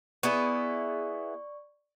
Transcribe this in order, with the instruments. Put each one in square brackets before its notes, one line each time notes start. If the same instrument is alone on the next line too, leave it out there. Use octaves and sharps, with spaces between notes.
[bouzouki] B3 E4 G#4 [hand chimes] D5 C#6